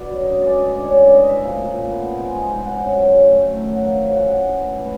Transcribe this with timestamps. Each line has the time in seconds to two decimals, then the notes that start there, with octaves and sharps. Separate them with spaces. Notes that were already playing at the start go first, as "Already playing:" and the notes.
Already playing: B2 B3 B4 D5
0.09 F#2
0.24 D3 D#5
0.38 G#3 D5
0.53 D3 D#5
0.68 D3 D5
0.83 C#4 C#5
0.99 E3 D5
1.14 C#4 D#5
1.29 C3 E5
1.44 A#2 F5
1.59 A#2
1.74 A#2
1.90 B3
2.04 C4
2.20 G#3
2.34 G#3
2.50 G#2
2.64 C4 F#5
2.79 C#3
2.95 F#3
3.09 F#3
3.25 A3
3.40 A3
3.54 D#3
3.70 D#3 F#5
3.85 F3 F5
4.01 C#3 F5
4.15 G#3 F#5
4.30 G#3 F#5
4.45 E3
4.61 A3
4.76 E3